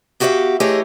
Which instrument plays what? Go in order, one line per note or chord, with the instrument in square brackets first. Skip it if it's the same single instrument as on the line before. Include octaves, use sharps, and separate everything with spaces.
[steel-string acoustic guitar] B3 F#4 G4 C5 E5 F5
E3 A3 G4 G#4 C#5 D#5